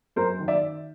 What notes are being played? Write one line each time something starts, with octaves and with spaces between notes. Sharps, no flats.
F#2 A#4 C5
D#3
D5 E5